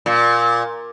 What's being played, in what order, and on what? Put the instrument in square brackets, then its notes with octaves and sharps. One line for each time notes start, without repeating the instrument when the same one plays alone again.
[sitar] A#2